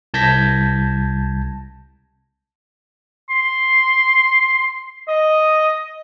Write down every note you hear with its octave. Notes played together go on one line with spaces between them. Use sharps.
C2 A5 G6 G#6 A#6 B6
C6
D#5